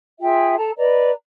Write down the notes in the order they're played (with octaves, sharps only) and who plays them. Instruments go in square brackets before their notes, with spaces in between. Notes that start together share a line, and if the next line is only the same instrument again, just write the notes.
[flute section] F4 G#4 E5 G5
A4 A5 A#5
B4 D5 D#5 A#5